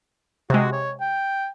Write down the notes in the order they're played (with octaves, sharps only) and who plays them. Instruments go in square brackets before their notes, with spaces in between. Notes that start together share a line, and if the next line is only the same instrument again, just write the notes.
[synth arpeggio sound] C3 G#3 [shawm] F#4
[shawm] C#5
G5